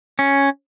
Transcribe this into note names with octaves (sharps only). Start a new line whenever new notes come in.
C#4